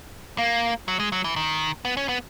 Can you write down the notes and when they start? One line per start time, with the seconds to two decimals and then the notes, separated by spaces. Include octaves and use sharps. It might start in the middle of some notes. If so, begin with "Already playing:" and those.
0.38 A#3
0.88 F#3
1.00 G#3
1.12 F#3
1.24 E3
1.36 D#3
1.85 B3
1.97 C#4
2.09 B3